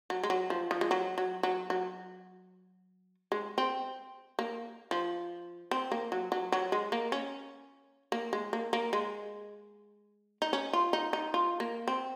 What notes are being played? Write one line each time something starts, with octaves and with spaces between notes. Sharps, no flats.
F#3
G#3
F#3
F3
F3
G#3
F#3
F#3
F#3
F#3
G#3
C4
A#3
F3
C4
A#3
F#3
F#3
F#3
G#3
A#3
C#4
A#3
G#3
A#3
A#3
G#3
D#4
C#4
F4
D#4
D#4
F4
A#3
C4